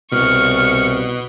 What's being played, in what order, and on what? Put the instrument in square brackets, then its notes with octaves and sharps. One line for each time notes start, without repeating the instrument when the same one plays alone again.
[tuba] C2 [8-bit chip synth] B2 [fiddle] C#6 [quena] F6